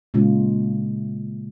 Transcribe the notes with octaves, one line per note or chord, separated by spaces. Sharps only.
A#2 C#3 G#3 F4